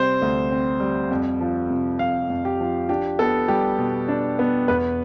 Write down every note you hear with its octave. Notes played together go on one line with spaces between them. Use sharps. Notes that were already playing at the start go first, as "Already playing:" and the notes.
Already playing: C3 G3 C4 C5
D2
C4
G3
F2
F3
C3
F2 F5
F2
G4
F3
D4 G4
B3 A4
G3 G4
B2
D4
B3
E2 B4